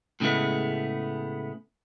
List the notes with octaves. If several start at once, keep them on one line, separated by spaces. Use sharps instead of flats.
A2 C#3 G#3 A3 B3